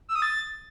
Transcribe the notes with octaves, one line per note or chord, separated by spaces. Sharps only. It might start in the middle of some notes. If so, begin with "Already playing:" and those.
E6
D#6
A6